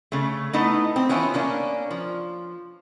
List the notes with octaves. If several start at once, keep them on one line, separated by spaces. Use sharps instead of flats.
C#3 A3
A3 B3 D#4 E4 D#5
C4
E3 B3 C#4 E4 F4
A#3 C#4 D4
F3